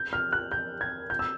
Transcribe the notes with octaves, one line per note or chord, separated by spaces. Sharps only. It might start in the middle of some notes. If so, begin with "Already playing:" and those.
Already playing: G6
F6
F#6
G6
G#6
G6
E6